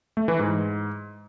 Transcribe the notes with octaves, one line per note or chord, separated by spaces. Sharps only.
A3
E3
G#2